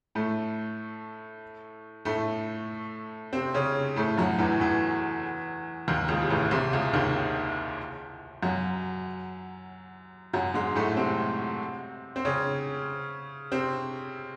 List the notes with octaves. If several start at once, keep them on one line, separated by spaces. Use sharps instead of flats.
A2 A3
A2 A3
C3 C4
C#3 C#4
A2 A3
F#2 F#3
E2 E3
E2 E3
D#2 D#3
C#2 C#3
C3
A1 A2
C2 C3
C#2 C#3
D#2 D#3
F#2 F#3
F#2 F#3
G#2 G#3
A2 A3
C3 C4
C4
C#3 C#4
C3 C4